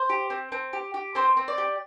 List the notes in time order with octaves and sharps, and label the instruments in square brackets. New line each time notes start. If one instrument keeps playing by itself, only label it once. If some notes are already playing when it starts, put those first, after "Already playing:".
Already playing: [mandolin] C5
G4
C4
C4
G4
G4
C4 C5
C4
D5
G4